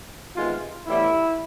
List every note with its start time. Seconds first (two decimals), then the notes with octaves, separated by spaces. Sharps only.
0.35 C3 D#3 G#3 B3 F4
0.86 A2 E3 G3 B3 E4